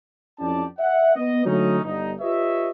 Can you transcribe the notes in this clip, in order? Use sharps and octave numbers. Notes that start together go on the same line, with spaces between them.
F2 C#4 E4 G4 D5 A5
E5 F#5
B3 D#5
D3 F#3 A3 C#4 D#4
G1 D#4
F4 G4 B4 C#5 D#5 E5